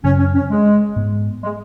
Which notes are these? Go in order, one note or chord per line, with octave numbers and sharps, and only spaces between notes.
F#2 C#3 F#3 C#4
C#4
C#4
G#3
G#2 G#3 B3
G#3